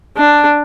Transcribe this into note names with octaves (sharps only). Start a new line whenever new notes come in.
D4